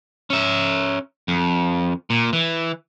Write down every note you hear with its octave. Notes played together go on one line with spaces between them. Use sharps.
C#4 E5
F2
A#2
E3